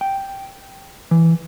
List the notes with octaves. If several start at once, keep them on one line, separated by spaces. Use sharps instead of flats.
G5
E3